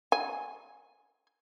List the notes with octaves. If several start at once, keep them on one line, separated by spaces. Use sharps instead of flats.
G#5